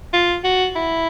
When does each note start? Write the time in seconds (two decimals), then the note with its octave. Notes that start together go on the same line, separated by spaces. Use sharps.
0.14 F4
0.44 F#4
0.76 E4